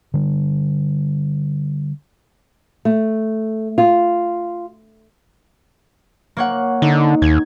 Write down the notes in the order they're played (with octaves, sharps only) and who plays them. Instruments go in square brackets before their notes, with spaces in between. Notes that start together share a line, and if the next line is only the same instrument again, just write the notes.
[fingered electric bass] D3 G3
[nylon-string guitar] A3
F4
[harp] A#3 C#5 F#5
[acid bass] D3 [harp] D#4
[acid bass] D#2 [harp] G#6